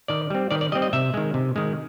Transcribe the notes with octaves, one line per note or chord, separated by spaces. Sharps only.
D#3 D5
G3 C4
D#3 D5
D5
G3 C4 D#5
D#5
C3 E5
D#3 G#3
C3
D#3 G#3